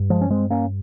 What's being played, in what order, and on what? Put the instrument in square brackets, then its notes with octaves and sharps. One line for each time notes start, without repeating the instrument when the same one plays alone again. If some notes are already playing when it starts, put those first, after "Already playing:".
Already playing: [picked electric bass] G2
F3 G#3
C#4
G#3 C4
A#3 C#4